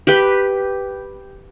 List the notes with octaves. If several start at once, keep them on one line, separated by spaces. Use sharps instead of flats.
G4 B4 G5